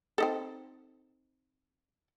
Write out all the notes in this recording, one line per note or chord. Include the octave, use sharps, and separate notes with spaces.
C4 D#4 A4